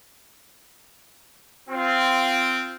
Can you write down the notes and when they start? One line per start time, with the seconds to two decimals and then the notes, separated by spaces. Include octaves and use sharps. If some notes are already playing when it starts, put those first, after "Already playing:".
1.68 C4 F4